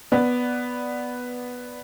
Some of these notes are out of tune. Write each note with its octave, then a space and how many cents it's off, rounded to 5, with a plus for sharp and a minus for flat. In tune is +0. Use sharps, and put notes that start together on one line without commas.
B3 +0 D5 +0